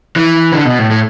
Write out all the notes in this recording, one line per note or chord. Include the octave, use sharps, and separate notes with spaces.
E3
D3
B2
A2
A2